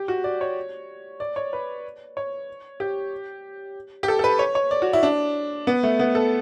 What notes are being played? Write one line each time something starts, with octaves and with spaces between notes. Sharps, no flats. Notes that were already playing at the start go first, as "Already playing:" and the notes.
Already playing: G4
F#4
D5
C#5
D5
C#5
B4
C#5
G4
G4
A4
A4
B4
C#5
C#5
D5
F#4
E4
D4
B3
A3
B3
A4